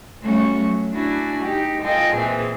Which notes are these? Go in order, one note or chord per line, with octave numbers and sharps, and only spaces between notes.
G3 A3 C#4 F#4
F#3
D4 E4 F#4 G#5
D#4 G4
F4 A4 D#5 G5 G#5
A#2 E3 C4 G#4